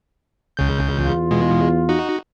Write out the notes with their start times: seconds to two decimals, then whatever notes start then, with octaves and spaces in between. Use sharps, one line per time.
0.57 C#2 C#3 G6
0.95 E2 F4
1.31 B2 G#3
1.89 D#4 F#4